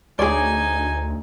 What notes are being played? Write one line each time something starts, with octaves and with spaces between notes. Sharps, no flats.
D2 D#4 G#4 C#5 D5 G#5